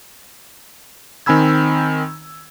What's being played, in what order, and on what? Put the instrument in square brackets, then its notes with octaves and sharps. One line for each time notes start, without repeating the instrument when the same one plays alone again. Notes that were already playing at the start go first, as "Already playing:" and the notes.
[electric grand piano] D#3 C4 G#5 B5 E6 G#6